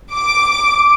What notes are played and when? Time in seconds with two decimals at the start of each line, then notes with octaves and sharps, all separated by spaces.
0.13 D6